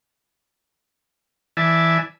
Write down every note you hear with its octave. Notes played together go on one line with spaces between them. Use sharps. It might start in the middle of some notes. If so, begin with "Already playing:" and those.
E3 D5 E5 G#5 A5